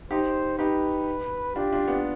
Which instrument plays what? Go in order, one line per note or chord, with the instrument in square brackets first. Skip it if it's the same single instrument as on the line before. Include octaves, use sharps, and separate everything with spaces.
[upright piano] D#4 G4 [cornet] C5
[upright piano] D#4 G4 [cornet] B4
[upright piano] D4 F4 [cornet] G4
[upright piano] D4 F4
B3 D4